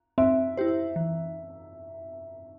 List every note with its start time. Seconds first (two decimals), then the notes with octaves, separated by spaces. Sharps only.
0.18 C4 E5
0.57 E4 G4 C5
0.96 E3